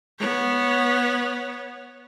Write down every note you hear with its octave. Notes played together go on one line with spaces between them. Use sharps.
B3 C#5